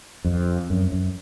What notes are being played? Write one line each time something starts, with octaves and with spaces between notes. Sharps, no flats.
F2
F#2
F#2